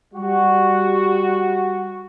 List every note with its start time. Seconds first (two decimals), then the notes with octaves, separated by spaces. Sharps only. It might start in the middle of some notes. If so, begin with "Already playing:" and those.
0.14 G3 F#4